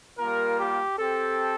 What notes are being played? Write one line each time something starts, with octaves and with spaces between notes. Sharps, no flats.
G3 A#3 F4 A#4
G4
C4 G4 A4